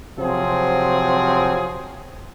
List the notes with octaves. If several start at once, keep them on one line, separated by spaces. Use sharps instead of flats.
C3 F3 F#3 C4 G#4